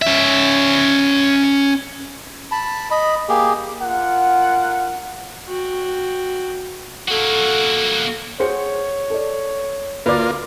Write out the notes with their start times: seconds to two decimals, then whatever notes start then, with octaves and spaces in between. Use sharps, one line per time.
0.02 C#4 E5
2.52 A5 B5
2.91 D#5 B5
3.29 A#3 G4 G#4
3.82 F4 A#4 F#5
5.47 F#4 G5
7.08 A#3 F#4 A4
8.40 G#4 C5 C#5 F#5 C#7
9.10 A4 D5
10.06 D2 A#3 F4 B4 D5